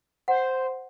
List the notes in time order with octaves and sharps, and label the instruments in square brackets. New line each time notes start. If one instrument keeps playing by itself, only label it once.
[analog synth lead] C5 [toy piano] F#5